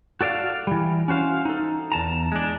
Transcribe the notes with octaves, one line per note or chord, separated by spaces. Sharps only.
F#4 A4 D5 E5 F5
E3 G3
C#4 F#4 C5 F5
D#4 A4
E2 A5 A#5
G#3 D4